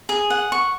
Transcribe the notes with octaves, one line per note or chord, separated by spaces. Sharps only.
G#4
F#5
C#6